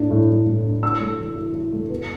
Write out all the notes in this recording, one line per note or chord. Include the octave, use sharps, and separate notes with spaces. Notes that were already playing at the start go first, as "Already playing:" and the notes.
Already playing: A2 D4
A2
A2
A2
D4
E4 E6
A3
E3
E4
E4
A3
B3